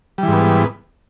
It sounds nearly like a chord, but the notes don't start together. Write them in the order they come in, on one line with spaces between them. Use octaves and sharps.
G3 E3 G#2 B3